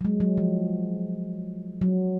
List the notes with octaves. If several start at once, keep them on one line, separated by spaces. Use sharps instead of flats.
F#3
G#3
F#3
F3
F#3